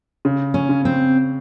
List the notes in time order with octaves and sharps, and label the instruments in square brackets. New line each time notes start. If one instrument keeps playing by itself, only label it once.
[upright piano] C#3
[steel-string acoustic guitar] C#4
[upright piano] C#3
[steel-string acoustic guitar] C4